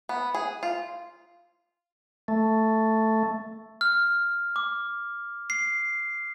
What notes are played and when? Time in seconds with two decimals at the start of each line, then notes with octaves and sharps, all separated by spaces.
0.09 B3
0.34 G#4
0.63 F4
2.28 A3
3.81 F6
4.56 D6
5.50 C7